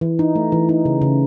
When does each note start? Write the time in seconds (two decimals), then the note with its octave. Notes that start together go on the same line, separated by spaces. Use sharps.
0.01 E3
0.19 D#4
0.36 A3
0.52 E3
0.69 D#4
0.85 C#3
1.02 C#3